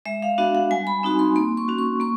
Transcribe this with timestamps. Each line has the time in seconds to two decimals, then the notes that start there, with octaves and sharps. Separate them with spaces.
0.06 G#3 E5
0.22 F5
0.38 B3 D4 F#4 E5
0.55 F#5
0.71 G3 G#5
0.87 B5
1.03 C4 D#4 F#4
1.19 C6
1.36 A#3 C6
1.57 C#6
1.68 C#4 F#4
1.78 C#6
2.00 A#3 C#6